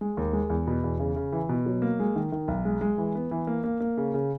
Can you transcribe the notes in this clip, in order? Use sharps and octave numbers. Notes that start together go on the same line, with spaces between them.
G#3
D#2
G#3
E2
B2
E2
C#3
C#3
E3
B2
F#3
A#3
G#3
D#3
D#3
B1
G#3
G#3
E3
B3
E3
A#3
A#3
A#3
C#3
C#3